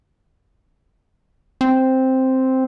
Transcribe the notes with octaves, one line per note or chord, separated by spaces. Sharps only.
C4